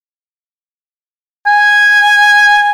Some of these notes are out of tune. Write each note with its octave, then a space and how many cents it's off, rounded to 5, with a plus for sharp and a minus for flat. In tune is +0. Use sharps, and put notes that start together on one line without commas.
G#5 -5